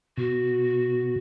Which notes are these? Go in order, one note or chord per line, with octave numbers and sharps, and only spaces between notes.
B2 F#4